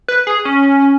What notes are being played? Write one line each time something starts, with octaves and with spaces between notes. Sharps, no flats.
B4
G#4
C#4